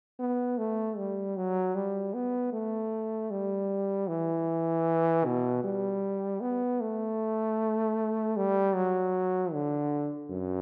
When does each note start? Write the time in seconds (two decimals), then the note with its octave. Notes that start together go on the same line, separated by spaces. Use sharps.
0.19 B3
0.58 A3
0.97 G3
1.37 F#3
1.75 G3
2.14 B3
2.53 A3
3.31 G3
4.08 E3
5.25 B2
5.64 G3
6.41 B3
6.80 A3
8.36 G3
8.75 F#3
9.53 D3
10.30 F#2